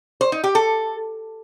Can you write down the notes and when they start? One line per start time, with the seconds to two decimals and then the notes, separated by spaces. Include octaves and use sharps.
0.21 C5
0.32 D#4
0.44 G4
0.55 A4